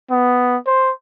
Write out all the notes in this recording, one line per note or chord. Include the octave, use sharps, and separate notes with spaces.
B3
C5